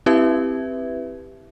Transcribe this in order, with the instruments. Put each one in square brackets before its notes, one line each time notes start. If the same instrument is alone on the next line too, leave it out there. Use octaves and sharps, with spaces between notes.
[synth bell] C4 E4 G4 B4 E5 G#6